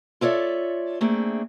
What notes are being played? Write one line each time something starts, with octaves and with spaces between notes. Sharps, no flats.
F4 A4 C#5 D5 E5
A3 A#3 C4 D4 G#4